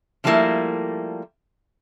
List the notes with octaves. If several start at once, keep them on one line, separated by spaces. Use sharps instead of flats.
D3 F3 G3 A3 A#3 E4